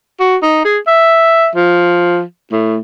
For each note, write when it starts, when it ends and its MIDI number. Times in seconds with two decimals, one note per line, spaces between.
0.20 0.36 66
0.42 0.63 63
0.65 0.78 68
0.87 1.47 76
1.56 2.21 53
2.52 2.77 45